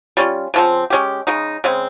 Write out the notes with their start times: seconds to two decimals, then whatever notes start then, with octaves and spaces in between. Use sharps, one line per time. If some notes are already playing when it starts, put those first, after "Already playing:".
0.17 G3 C#4 F4
0.54 C#3 F3 C4
0.90 G#3 C#4 G4
1.27 C#3 G#3 D#4
1.64 C#3 G#3 C4